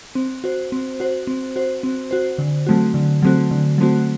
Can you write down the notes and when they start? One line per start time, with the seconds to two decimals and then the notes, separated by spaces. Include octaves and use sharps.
0.15 C4
0.44 F#4 C5
0.72 C4
1.00 F#4 C5
1.27 C4
1.56 F#4 C5
1.83 C4
2.11 F#4 C5
2.38 D3
2.67 F#3 A3 C4 F#4
2.94 D3
3.22 F#3 A3 C4 F#4
3.51 D3
3.78 F#3 A3 C4 F#4